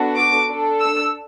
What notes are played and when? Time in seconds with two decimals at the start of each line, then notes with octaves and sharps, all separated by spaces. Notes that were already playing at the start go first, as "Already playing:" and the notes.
Already playing: B3 D4 F#4 A4
0.16 D6
0.49 D4 A4
0.81 E6